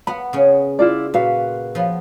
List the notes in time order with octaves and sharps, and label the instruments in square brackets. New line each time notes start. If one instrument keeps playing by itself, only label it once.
[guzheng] B3 [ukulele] F#5 B5
[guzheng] C#3 C#4
[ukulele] E4 F4 D5
[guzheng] A#2 [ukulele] F#4 B4 F5
[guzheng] F3 B3